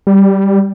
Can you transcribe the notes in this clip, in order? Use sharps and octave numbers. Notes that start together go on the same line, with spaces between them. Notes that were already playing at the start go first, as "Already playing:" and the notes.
G3